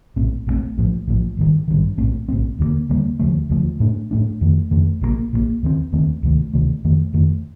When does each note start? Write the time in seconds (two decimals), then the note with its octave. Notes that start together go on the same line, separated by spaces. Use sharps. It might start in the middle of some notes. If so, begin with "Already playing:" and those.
0.16 A#1 A2 A3 C4
0.47 A#1 A2 A3 C4
0.77 A#1 A2 F3
1.08 A#1 A2 F3
1.37 A1 G2 D#3
1.68 A1 G2 D#3
1.98 A#1 A2 A3 C4
2.28 A#1 A2 A3 C4
2.59 D#2 D3 G3 A#3
2.89 D#2 D3 G3 A#3
3.19 D#2 D3 F3 A3
3.50 D#2 D3 F3 A3
3.80 A2 A3 D4
4.11 A2 A3 D4
4.41 F2 D#3 A3
4.71 F2 D#3 A3
5.01 A#1 A#2 F3 A#3
5.33 A#1 A#2 F3 A#3
5.63 D#2 D#3 A3 C4
5.92 D#2 D#3 A3 C4
6.23 D2 C3 D#3 A3
6.54 D2 C3 D#3 A3
6.84 F2 D#3 A3
7.14 F2 D#3 A3